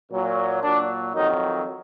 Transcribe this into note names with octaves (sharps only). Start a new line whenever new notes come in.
A#2 F#3
A#2 F#3 D4
F2 D#3 F#3 D#4